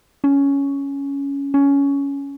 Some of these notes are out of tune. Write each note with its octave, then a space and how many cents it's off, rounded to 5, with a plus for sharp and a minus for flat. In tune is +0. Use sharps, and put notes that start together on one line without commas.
C#4 +10
C#4 +15